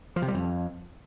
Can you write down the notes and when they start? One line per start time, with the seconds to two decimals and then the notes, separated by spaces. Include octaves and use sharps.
0.16 F3
0.22 C3
0.28 G3
0.34 F2